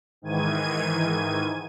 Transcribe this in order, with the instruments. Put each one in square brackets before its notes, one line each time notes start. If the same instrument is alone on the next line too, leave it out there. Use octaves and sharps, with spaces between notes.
[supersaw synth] G#2 D#3 E3 G#6 D#7